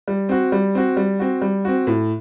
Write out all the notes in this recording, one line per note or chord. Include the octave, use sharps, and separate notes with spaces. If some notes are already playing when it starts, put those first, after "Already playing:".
G3
C4 F#4
G3
C4 F#4
G3
C4 F#4
G3
C4 F#4
A2